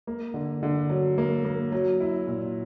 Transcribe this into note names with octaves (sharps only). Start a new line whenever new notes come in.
A#3
D3
D3
F#3
A#3
A#3
F#3
E4
A#2